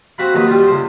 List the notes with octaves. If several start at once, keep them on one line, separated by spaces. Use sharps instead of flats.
C4 F#4 F5 B5
D#2 F#3 D#4 B4
G3 F4
C#2 C5